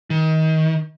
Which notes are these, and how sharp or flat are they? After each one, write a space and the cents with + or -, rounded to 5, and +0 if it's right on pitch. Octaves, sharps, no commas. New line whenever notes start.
D#3 +25